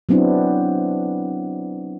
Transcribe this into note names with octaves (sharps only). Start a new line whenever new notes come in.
F#3 B3 C4 D4 E4